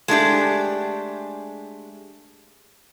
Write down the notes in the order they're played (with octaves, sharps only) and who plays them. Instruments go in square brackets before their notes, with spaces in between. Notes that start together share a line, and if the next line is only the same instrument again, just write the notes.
[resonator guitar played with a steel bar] G#3 A3 D4 G4